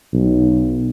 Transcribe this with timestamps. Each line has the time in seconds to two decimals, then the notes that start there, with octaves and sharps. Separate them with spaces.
0.13 B1